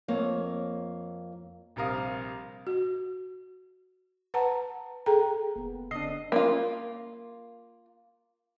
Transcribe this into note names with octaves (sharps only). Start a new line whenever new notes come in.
F2 A#3 C#5
A#1 C3 G3 A#4 F5 D#6
F#4
B4 F#5 A5 A#5
G#4 A4 G5 A#5
F1 A#3 B3
D3 C4 D4 D#5 C7
A#3 F4